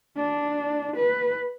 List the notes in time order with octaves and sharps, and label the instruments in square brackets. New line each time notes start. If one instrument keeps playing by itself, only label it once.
[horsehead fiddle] D4
B4